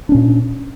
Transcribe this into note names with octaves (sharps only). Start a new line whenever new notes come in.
A#2 C#4 D4